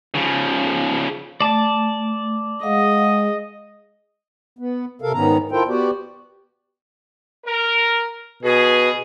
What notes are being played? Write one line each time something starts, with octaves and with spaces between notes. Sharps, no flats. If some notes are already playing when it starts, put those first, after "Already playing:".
C#3 F3
A3 D5 A5
G#3 D#5 F5 F#5
B3
C3 A4 A#4 F5
G#2 D#3 B3 C#4 A#5
E4 F4 A4 A#4 C5 G5
B3 F#4 G4 D5
A#4
B2 G#4